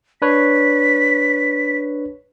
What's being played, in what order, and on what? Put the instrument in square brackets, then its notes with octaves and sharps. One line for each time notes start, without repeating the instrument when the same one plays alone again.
[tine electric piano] D4 B4 C#5 [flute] B6